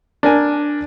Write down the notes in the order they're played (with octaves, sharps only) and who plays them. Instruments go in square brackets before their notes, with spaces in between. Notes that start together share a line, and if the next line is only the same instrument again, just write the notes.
[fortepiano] D4 A#4 G#5